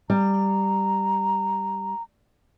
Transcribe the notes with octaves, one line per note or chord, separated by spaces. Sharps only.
G3 A#5